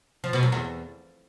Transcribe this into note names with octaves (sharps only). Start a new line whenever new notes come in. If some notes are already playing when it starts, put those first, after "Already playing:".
F3
B2
F#2
E2